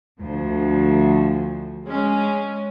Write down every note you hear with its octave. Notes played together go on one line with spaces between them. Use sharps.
D2 F3
G#3 C#4